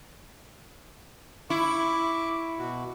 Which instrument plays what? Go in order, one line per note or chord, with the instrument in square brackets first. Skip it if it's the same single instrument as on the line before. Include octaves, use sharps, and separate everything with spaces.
[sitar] E4 [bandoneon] C#6 D6
[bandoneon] B2 F#4